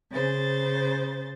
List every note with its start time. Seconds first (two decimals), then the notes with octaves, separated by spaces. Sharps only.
0.12 C#3 C5 A6